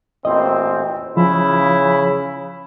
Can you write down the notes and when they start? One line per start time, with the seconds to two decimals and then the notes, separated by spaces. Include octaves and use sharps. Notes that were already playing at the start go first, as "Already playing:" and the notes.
0.25 A1 A#2 C4 D#5
1.17 C#3 F3 E4